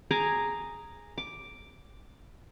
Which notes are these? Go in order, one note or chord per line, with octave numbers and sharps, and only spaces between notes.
G#4 G#5 A#5 D6
D6